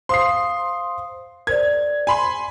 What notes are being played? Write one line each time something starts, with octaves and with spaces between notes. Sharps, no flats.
C5 F5 C6 D#6 C7
A#4 C5 D5 G#6
G#5 B5 C6